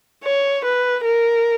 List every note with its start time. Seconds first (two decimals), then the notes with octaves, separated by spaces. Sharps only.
0.24 C#5
0.65 B4
1.05 A#4